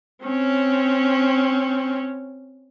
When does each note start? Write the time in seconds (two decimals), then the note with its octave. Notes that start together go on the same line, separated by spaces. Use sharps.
0.23 C4 C#4